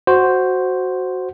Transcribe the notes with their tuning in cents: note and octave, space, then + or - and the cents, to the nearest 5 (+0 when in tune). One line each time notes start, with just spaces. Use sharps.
F#4 +0 C5 +0